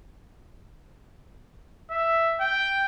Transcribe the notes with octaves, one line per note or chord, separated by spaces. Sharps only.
E5
G5